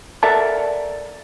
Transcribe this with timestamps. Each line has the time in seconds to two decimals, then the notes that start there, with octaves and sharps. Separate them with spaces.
0.23 A4 A#4 D5 E5 F#5 A5